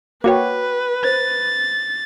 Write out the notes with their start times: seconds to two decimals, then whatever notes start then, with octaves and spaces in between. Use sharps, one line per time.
0.24 A#3 F#4 B4 C#5 G5 D6
1.04 C5 A6